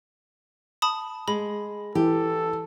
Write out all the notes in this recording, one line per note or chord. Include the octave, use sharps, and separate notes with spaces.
A5 B5 D#6
G#3 B5
E3 G4 A4